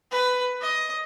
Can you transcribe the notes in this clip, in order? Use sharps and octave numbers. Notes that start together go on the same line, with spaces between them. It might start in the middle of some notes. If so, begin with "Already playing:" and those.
B4
D#5